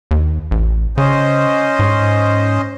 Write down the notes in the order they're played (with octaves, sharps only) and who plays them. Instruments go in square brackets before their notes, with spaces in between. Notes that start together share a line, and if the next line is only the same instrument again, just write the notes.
[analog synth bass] D#2
A1
[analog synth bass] C#3 [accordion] C#4 C5 D#5
[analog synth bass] G#2